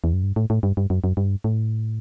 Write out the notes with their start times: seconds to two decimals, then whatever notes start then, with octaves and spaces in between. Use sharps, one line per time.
0.04 E2
0.13 F#2
0.23 G2
0.36 A2
0.50 A2
0.63 G2
0.77 G2
0.90 F#2
1.04 F#2
1.17 G2
1.44 A2